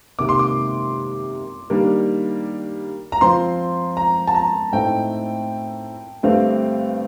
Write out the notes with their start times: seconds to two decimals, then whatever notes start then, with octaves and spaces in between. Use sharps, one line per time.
0.19 C3 D#3 A#3 D6
0.29 C6
0.39 D6
1.70 D#3 G3 A#3 D4
3.12 A#5
3.21 F3 C4 F4 C6
3.97 A#5
4.27 A5
4.34 A#5
4.72 A2 A3 C4 D#4 G5
6.23 G2 D3 A3 C4 G4 F5